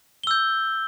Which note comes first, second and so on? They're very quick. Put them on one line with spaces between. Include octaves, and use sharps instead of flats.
G7 E6 G6